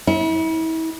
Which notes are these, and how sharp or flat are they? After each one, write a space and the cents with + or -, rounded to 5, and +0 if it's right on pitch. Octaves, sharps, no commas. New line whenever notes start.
E4 -35